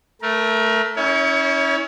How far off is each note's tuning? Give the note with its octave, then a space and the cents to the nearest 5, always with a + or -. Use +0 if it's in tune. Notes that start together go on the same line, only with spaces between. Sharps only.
A3 +5 A#4 +25
C#4 +0 E4 -35 C#5 +25